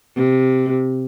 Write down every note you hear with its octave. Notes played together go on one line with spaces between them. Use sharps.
C3